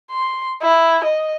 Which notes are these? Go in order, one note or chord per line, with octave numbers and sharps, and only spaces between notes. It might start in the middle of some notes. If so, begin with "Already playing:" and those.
C6
E4
D#5